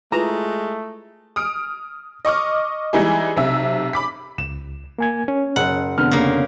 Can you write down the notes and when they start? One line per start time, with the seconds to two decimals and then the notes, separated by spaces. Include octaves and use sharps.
0.12 G#3 A3 E4 F4 B4 A#5
1.36 D#6 F6 D7
2.25 D#5 C#6 D6 F6
2.93 E3 G3 G#3 D#4 E4 G#4
3.37 B1 C3 E5
3.93 B5 D6 B6
4.38 C#2 E7
4.98 A#3 G#5 G#6
5.28 C#4
5.56 F#1 F#5
5.98 F1 D3 B3 F6
6.11 C#3 A#3